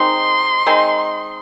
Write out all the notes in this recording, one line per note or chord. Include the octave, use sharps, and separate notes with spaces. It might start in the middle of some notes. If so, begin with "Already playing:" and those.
Already playing: D#3 G#3 C4 D#4 C6
D#3 G#3 C4 D#4